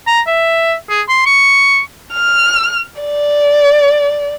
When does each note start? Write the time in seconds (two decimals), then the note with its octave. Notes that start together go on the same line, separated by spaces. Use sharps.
0.07 A#5
0.27 E5
0.90 G#4
1.09 C6
1.26 C#6
2.13 F6
3.01 D5